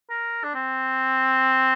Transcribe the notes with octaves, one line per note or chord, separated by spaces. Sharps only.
A#4
D4
C4